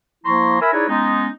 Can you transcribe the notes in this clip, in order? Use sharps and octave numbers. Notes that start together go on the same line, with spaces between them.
F3 A#3 E4 A#5 C6 C#6
A#4 E5 G#5 B5
D#4 E4 G#4 B4 C#5 D5
G#3 B3 C#4 D#4